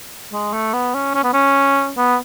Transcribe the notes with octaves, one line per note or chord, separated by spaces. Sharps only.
G#3
A3
B3
C#4
C#4
B3
C#4
B3